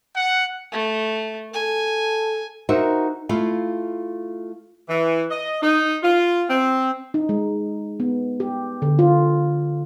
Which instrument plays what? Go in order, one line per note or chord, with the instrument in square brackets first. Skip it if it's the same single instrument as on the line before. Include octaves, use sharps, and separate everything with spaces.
[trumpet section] F#5
[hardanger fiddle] A3
[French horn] A4 [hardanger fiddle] G#5
[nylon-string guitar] D#4 F#4 A#4 C5 E5
A3 E4 F4 F5
[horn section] E3
D#5
D#4
F4
C4
[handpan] D#4
G#3
B3
G4
D3
F4